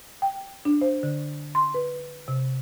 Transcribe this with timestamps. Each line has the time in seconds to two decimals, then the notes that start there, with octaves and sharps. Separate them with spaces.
0.22 G5
0.65 D4
0.81 C5
1.03 D3
1.55 C6
1.74 B4
2.28 C3